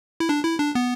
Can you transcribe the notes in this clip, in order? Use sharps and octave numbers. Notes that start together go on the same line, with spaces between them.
E4
D4
E4
D4
B3